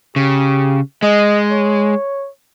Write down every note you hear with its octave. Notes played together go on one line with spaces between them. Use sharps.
C#3 G4
G#3 D#5
C#5